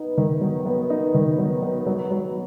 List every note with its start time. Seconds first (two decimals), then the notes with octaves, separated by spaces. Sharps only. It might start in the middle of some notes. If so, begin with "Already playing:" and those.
Already playing: B3 D#4
0.18 D#3
0.41 F#3
0.66 B3
0.90 D#4
1.14 D#3
1.38 F#3
1.62 B3
1.86 F#3
2.11 F#3